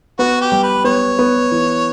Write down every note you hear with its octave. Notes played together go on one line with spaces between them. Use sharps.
B3 F#4
G4
G3
B4
B3 C#5
B3
E3